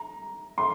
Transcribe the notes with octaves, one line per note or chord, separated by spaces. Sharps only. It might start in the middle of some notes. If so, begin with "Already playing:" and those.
Already playing: A#5
C6